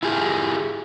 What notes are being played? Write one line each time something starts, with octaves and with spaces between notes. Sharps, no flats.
E4 F4 G4 G#4